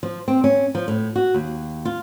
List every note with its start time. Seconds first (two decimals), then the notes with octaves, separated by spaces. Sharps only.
0.03 F3
0.28 C4
0.44 C#4
0.75 F3
0.88 A2
1.16 F#4
1.34 D#2
1.85 F4